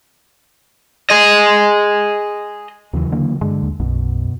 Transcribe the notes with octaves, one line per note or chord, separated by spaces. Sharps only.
G#4 D#5
D#2 C#3 E3 F#3
D3 A#3
G2 D3 G#3
D#2
B1 F#2 B2